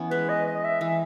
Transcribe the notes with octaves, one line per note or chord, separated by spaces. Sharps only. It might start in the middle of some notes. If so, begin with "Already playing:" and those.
Already playing: E3 B3 C#4
G#3 B4
D#5
D#5
E5
E3 E5